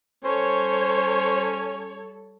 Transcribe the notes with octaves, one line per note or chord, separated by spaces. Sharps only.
G3 C#4 A4 C5 C#5